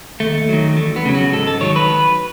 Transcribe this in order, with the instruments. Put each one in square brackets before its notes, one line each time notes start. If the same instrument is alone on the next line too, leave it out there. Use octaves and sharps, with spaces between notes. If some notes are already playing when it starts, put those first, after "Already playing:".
[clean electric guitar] D#2 A3
D#3 F#3
E2 A3
B3
C#3 F#3
F#4
G#2 A4
A4
D#3 F#3 C#5
B4